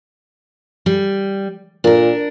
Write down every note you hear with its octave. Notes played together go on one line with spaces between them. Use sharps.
G3
A#2 D4 A#4